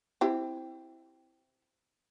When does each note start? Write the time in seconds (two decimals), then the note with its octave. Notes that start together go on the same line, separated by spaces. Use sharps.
0.21 C4 E4 G4